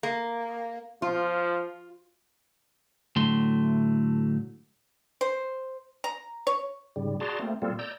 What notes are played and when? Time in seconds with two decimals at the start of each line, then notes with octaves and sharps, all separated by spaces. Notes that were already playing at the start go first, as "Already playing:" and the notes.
0.03 A#3
1.02 F3 F4
3.16 A2 D3 F#3 A3 C6
5.21 C5
6.04 A#5
6.47 C#5
6.96 G#2 C#3 G3
7.20 F#4 G#4 D5 A5 A#5 C6
7.39 A3 A#3 C4
7.62 A#2 G3 A#3 C4 F4 A4
7.79 D5 A#5 E6 G6